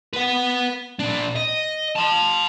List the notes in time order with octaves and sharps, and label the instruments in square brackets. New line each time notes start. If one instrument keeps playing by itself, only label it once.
[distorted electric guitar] B4 F#5
A#2 D4
D#5
A5 C6